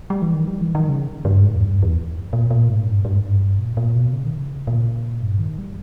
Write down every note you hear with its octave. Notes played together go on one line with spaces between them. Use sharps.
G3
E3
D#3
G3
E3
D#3
C#3
G2
G#2
E2
G#2
G2
E2
A#2
A#2
G#2
G2
G2
G#2
G2
A#2
A#2
B2
C#3
D#3
C#3
A#2
G2
D#3
G3